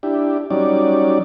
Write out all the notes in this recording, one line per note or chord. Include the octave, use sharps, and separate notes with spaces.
D4 E4 G4
F#3 G3 C#4 D#4 D5